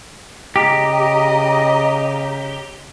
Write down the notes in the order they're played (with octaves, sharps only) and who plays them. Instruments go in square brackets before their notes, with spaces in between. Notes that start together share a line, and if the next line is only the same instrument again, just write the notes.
[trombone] C#3 [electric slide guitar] G4 [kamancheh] D#5 [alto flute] A#5